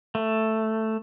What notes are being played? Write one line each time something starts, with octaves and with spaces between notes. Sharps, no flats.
A3